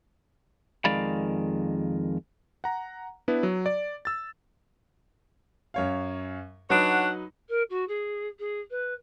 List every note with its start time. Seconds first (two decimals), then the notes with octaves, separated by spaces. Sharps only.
0.85 F2 D#3 G#3 D5 F5 B5
2.64 F#5 A#5
3.28 B3 D4 E4 B4
3.43 F#3
3.66 D5
4.05 E6 A6
5.74 F#2 C#5 F5
6.70 F#3 D4 D#4 B4 C#5 F#5
7.49 A#4
7.70 F#4
7.88 G#4
8.39 G#4
8.71 B4